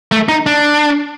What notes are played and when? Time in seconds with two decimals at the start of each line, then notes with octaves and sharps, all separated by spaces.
0.12 A3
0.29 D#4
0.46 D4